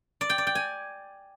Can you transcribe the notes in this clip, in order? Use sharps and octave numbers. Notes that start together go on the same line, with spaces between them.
D5
G5
D5
G5
G#5